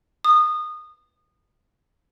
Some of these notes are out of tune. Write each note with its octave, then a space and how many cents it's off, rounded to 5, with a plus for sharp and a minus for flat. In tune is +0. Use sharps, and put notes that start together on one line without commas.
D#6 -20